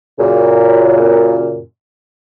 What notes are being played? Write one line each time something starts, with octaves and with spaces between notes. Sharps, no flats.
F#2 A#2 C#3